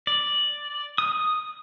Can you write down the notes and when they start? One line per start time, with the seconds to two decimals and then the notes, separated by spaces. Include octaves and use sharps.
0.07 D5
0.98 D#6